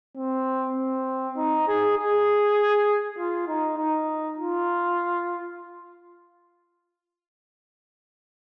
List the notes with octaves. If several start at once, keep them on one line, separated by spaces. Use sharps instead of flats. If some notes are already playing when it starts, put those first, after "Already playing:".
C4
C4
D#4
G#4
G#4
F4
D#4
D#4
F4